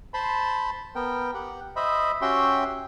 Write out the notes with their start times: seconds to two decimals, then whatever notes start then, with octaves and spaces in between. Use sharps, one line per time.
0.14 C5 A5 B5 C6
0.95 B3 A#4 G5
1.34 G4 F#5
1.76 C5 D#5 E5 B5
2.21 C#4 F#4 G4 E5 G5 C6